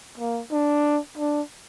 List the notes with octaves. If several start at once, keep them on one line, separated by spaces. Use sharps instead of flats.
A#3
D4
D4